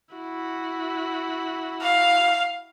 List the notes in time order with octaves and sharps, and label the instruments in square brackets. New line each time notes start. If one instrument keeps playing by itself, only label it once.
[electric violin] E4 F#4
[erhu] F5